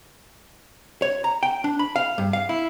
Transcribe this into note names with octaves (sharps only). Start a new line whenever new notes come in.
C#5
A#5
G5
D4
B5
F5
G2
F5
E4